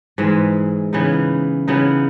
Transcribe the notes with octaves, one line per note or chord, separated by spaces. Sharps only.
G#2 E3 G#3
C#3 E3 B3 D#4
C#3 E3 B3 D#4